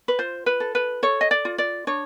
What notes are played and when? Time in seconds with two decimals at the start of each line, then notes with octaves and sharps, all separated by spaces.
0.08 B4
0.19 F4 C5
0.46 B4
0.60 A4
0.75 B4
1.03 A4 C#5
1.21 D#5
1.31 D5
1.45 F4
1.58 D5
1.87 D4 C#5